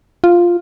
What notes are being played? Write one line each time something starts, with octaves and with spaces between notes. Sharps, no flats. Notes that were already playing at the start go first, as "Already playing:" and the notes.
F4